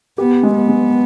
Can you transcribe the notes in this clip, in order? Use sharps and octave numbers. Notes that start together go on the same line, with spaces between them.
B3 G4
G#3
B3
G#3